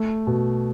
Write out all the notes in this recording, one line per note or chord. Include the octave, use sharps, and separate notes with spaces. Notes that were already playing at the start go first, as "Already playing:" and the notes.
Already playing: A3
B2